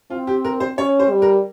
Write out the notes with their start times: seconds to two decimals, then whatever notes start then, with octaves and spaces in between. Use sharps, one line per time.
0.10 C4 F4
0.27 G4
0.45 A#4
0.60 C5
0.78 C#4 C#5
0.99 C5
1.10 G3
1.22 A#4